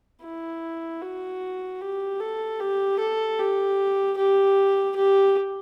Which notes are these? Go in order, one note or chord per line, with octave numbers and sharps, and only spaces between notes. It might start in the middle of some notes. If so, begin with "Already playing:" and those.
E4
F#4
G4
A4
G4
A4
G4
G4
G4